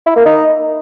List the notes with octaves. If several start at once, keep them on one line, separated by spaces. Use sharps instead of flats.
E4
A#3
D#4